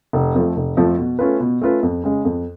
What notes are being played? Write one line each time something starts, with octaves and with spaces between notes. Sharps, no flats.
F1
F2 F3 A3
F1
F2 F3 A3
B2
A3 C#4 F4 B4
B2
A3 C#4 F4 B4
F2
C#3 G#3
F2